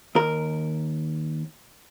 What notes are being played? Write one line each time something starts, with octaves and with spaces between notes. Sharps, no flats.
D#2 A#4